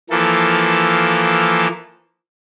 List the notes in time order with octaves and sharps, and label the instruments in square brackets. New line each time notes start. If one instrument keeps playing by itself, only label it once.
[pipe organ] E3 F3 A#3 A4